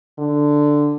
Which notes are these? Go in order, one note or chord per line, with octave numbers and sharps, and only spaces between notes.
D3